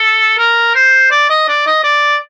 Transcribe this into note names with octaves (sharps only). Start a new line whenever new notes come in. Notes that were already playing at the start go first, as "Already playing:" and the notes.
Already playing: A4
A#4
C5
D5
D#5
D5
D#5
D5